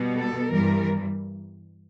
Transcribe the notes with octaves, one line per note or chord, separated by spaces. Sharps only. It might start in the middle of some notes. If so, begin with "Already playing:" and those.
Already playing: B2 G3 B3
A4
G2 E3 G3 A#4